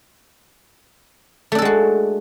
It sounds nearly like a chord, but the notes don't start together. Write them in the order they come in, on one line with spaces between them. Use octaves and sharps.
A3 D4 A4 G#3 F#4